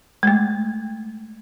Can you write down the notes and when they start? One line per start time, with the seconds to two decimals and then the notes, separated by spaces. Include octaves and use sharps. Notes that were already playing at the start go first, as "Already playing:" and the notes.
0.23 G#3 A3